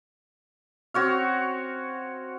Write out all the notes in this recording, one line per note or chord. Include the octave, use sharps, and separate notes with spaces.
C4 F#4 C#5 F5